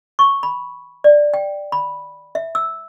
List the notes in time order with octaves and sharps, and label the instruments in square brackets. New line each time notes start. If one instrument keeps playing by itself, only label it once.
[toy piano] C#6
B5
D5
G5
B5
E5
E6